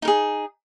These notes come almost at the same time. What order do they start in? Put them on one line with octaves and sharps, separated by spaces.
D#4 A#4 G#4